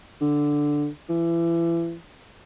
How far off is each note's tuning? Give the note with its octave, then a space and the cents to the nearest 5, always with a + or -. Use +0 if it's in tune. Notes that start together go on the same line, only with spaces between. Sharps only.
D3 +0
E3 +30